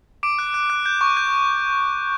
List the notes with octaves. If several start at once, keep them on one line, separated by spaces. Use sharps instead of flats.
D6 D7
F#6
F#6
F#6
G6
C#6
G6